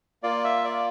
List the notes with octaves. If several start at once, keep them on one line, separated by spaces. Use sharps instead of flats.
A#3 F4 D5
E5
D5